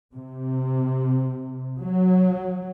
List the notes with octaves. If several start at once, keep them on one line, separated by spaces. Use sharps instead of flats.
C3
F#3